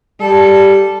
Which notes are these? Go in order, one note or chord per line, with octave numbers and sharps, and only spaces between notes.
G3 A4